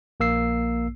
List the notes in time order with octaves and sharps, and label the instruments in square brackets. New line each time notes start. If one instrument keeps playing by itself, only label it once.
[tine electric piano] A#1 A#3 E6 C7